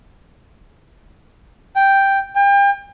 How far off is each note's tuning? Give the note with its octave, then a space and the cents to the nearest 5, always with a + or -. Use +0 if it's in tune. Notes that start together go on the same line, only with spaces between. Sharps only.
G5 +0
G5 +35